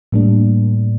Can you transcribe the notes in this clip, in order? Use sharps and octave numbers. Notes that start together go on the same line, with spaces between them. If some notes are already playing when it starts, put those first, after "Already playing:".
A2 G3 A#3 D4